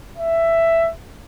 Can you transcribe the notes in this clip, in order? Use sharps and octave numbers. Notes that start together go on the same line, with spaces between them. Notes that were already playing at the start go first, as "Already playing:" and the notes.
E5